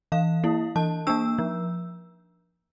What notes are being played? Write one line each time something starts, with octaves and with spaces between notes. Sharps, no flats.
E3 F5
A#3 E4
E3 A5
A#3 D4 E6
F3